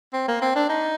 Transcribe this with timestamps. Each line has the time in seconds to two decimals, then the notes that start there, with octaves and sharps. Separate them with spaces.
0.13 C4
0.28 A#3
0.42 C4
0.56 D4
0.69 D#4